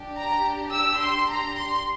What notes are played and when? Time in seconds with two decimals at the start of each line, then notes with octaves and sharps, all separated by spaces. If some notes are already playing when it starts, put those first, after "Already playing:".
Already playing: D4 G4
0.18 A#5
0.73 E6
1.02 C6
1.30 A#5
1.58 C6